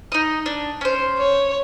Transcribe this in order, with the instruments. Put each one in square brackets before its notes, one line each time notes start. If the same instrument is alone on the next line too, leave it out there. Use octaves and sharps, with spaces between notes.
[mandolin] D#4 D#5
D4
C#4 C5
[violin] C#5